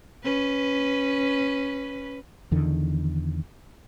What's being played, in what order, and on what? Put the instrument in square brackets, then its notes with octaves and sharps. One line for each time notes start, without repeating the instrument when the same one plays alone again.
[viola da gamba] C#4 B4
[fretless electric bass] E2 D3 D#3